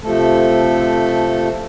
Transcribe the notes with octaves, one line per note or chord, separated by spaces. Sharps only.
C3 F3 A3 A4